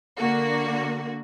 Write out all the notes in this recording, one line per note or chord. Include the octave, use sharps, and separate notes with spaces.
D3 A#3 F#4